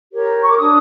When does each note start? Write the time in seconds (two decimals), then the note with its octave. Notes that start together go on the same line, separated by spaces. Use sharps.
0.11 G4 A#4 C#5
0.41 C#6
0.49 D6
0.57 D4 D#6